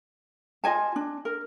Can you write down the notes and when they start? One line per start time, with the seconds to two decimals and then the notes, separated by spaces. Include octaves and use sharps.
0.64 F4 D#5 G#5 A5
0.96 D4
1.25 A#4